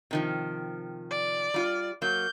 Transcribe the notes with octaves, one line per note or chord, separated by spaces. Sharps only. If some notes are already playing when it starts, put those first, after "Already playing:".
C3 D#3 F3
D5
G3 F4
F#3 A#3 G6